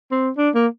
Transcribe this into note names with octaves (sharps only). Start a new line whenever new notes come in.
C4
D4
A#3